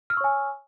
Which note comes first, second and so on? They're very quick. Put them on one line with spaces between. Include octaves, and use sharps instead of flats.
F6 E6 C#6 C#5 G#5